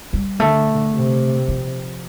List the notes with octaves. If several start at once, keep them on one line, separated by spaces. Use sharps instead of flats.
G3
D3 A3
C3
F3